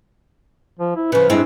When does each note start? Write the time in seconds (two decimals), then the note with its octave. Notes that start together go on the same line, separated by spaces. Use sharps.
0.79 F3
0.96 E4
1.12 C#3 F3 B4
1.30 G2 G#3 C4 E4